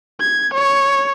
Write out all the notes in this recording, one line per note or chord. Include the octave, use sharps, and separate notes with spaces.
G#6
C#5